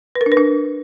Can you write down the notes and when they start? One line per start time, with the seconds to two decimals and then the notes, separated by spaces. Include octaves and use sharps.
0.15 B4
0.21 A#4
0.26 D4
0.32 B4
0.37 D4